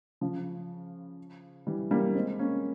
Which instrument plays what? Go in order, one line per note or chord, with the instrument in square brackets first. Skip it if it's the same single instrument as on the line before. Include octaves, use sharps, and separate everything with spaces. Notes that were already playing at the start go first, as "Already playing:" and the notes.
[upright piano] C#3 F3
E3 G3
G3 A#3
G#3 C4
A#3 C#4